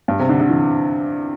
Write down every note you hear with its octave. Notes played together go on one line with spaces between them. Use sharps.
G2
C3
D3
D3
E3